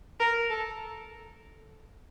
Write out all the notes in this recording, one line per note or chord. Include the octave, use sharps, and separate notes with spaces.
A#4
A4